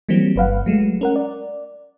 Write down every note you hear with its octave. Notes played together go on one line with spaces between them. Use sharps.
E3 F#3 G3 A#3 C4
G1 B4 F5 F#5
F#3 G#3 A3
C#4 A#4 F#5
D5